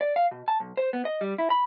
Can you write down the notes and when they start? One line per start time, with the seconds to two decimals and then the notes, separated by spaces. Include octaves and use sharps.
0.01 D5
0.16 F5
0.31 B2
0.48 A5
0.60 B1
0.77 C5
0.93 B3
1.05 D#5
1.21 G3
1.38 E4
1.50 B5